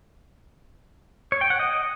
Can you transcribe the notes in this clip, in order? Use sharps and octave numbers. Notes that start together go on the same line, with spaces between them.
C#5
G5
F#5
D#5